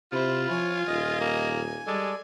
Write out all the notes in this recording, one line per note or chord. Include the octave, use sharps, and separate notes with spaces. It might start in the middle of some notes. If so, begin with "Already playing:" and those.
C3 E4 F4 C5
F3 C#5 G#5
D#1 D#5
A#3
G3 G#3 A4 D5